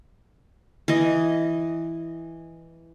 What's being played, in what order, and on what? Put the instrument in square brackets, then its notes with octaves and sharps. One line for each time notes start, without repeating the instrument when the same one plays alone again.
[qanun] E3 D#5